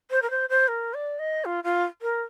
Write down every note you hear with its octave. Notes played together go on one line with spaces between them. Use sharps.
C5
A#4
C5
C5
A#4
D5
D#5
F4
F4
A#4